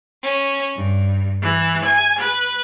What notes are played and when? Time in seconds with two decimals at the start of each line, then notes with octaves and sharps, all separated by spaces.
0.22 C#4
0.76 G2
1.41 E3
1.84 G#5
2.18 B4